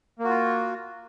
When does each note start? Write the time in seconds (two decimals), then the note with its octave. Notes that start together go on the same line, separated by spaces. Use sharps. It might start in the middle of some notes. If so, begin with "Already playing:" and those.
0.19 A#3
0.24 F#4
0.29 F4